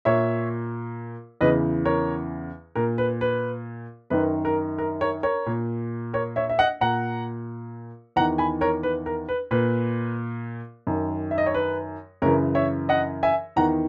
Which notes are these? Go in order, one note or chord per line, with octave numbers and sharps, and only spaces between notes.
A#2 C#5 E5
E2 C#3 E3 B4 D#5
A#4 C#5
A#2 A#4
B4
B4
F#2 D#3 B4
A#4
A#4
A#4 C#5
A#4 C#5
A#2
A#4 C#5
C#5 E5
E5
D#5 F#5
A#2 F#5 A#5
E2 D#3 F#5 A#5
G#5 B5
A#4 C#5
B4
A#4
B4
A#2 B4
F#2 D#3
E5
D#5
C#5
B4
F#2 C#3 E3 A#4 C#5
C#5 E5
D#5 F#5
E5 G#5
E2 D#3 F#5 A#5